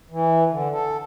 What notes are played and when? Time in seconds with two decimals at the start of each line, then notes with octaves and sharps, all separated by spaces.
0.10 E3
0.49 D3
0.71 A4